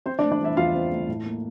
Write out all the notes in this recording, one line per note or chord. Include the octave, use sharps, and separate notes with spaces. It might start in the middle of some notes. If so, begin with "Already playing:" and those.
C4 C5
D4 D5
A3
D4 D5
E3 E4 E5
E2 F4 F5
C4
A3
A2
A#3